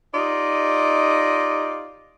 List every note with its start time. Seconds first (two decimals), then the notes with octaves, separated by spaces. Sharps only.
0.14 D#4 F4 G4 D5 D#5